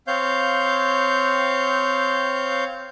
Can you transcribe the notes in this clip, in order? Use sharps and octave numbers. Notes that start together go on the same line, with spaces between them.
C4 C#5 F5 G6